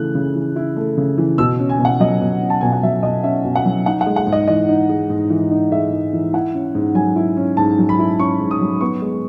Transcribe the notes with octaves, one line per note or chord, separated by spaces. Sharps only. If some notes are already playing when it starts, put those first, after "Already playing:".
Already playing: C#3 E3 A3 E4 F#6
C#3
E3
E4
A3
C#3
E3
B2 E6
C#4
G#5
B2
F#5
F#3 D#5
B2
C#4
A5
B2 G#5
F#5
F#3 E5
B2 D#5
C#4 E5
B2
F#5
F#3
D#4 F#5
F#5
G#3
F#5
G#2
D#5
E3 D#5
D#4
G#3
G#2
E3
D#4
G#3 E5
G#2
E3
E4 F#5
C#4
G#2
F#3 G#5
E4
C#4
G#2 A5
F#3
B5
E4
C#4 C#6
G#2
D#6
F#3
B3 C#6
G#3